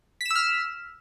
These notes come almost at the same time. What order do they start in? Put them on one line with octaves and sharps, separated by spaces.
B6 E7 E6 F6